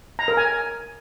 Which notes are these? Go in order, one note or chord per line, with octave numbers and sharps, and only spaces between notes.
A#5
A#4
G#5